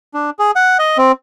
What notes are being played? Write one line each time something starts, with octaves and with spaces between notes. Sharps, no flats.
D4
G#4
F#5
D#5
C4